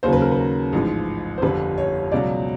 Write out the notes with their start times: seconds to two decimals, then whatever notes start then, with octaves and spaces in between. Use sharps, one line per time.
0.03 D#2 C#3 F#3 C5
0.13 B4
0.22 A#4
0.32 B4
0.73 A1 G#2 F3
1.38 C5
1.42 G1 F2 D3 G3 B4
1.78 C#5
2.12 C#2 B2 F#3 D5